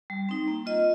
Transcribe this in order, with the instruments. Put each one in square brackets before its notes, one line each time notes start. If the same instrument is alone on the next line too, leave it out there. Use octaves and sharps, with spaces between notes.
[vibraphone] G3
C4 D#4
A#3
F4 D#5